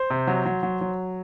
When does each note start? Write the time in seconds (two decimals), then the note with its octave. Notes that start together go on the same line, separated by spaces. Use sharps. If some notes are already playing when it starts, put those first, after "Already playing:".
Already playing: C5
0.10 C3
0.27 F#3
0.46 F#3
0.63 F#3
0.81 F#3